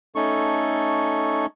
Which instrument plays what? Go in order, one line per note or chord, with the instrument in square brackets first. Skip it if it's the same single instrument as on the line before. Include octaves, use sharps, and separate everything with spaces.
[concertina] A3 C#4 D#4 A4 C#6